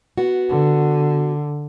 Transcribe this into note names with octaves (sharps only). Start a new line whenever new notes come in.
B3 F#4
D3